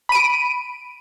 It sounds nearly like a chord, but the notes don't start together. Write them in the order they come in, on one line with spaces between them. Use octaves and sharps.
B5 D#7 D7